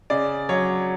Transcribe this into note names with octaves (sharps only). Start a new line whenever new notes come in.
C#3 D5
F#3 C#5